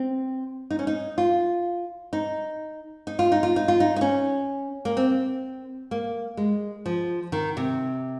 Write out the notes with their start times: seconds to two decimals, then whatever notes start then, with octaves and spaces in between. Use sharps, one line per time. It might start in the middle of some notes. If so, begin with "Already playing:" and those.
Already playing: C4
0.70 D#4
0.79 C#4
0.87 D#4
1.18 F4
2.13 D#4
3.07 D#4
3.19 F4
3.32 D#4
3.43 F4
3.56 D#4
3.68 F4
3.80 D#4
3.96 D#4
4.01 C#4
4.85 A#3
4.97 C4
5.91 A#3
6.37 G#3
6.86 F3
7.32 D#3
7.57 C3